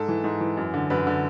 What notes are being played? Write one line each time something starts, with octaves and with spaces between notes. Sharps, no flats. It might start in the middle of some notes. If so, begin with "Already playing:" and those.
Already playing: G#2 A4
E3
G#2
E3
F#2
D3
F#2 B4
D3